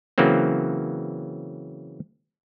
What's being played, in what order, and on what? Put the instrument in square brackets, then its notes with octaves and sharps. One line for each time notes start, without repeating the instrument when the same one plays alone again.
[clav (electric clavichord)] C#3 E3 F#3 A#3 C4